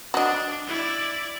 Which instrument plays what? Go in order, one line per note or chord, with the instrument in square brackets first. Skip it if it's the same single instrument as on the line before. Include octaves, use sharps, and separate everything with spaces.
[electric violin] D4 [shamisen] F#4 D#5
[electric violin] E4 D5